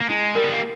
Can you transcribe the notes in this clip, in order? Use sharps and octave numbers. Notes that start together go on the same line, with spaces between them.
A#3
G#3 E4
G3 A#4
B3
A#3